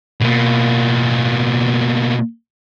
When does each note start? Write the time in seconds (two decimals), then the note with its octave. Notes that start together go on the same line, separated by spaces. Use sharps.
0.21 B2 A#3